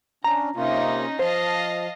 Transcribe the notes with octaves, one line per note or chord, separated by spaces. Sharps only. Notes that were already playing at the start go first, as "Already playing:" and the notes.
C#4 D4 A#5
C3 A#3 C#4 D#4 F4
F3 C5 D#5 F5 A5